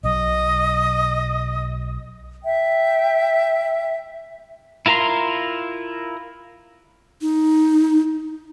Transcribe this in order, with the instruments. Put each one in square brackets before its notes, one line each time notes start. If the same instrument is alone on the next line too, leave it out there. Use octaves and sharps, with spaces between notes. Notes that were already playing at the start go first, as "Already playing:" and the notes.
[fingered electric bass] B1 B2 F#3 [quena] D#5
[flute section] E5 G5
[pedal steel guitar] E4 F4 A#4 A#5 C6
[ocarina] D#4